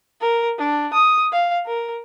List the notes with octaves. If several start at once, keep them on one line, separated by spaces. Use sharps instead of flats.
A#4
D4
D#6
F5
A#4